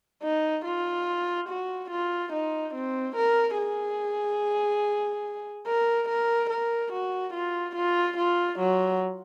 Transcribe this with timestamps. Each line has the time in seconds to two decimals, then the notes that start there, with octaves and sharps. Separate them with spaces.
0.23 D#4
0.65 F4
1.48 F#4
1.90 F4
2.33 D#4
2.74 C4
3.16 A#4
3.58 G#4
5.67 A#4
6.09 A#4
6.50 A#4
6.92 F#4
7.34 F4
7.75 F4
8.18 F4
8.59 F#3